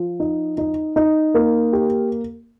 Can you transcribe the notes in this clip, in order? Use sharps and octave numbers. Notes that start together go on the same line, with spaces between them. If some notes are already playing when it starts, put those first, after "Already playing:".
Already playing: F3
D#4
D#4
D#4
A#3
G4